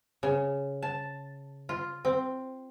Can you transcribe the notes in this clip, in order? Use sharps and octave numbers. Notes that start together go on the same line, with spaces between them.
C#3
A5
F4
C4